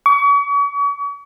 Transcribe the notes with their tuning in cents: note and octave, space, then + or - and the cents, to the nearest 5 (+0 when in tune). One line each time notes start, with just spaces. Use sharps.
C#6 +40